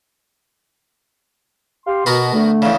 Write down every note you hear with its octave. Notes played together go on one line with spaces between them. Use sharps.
G4 F5 C6
B2 B3 F#4 A#4
D3 A3
E2 C#3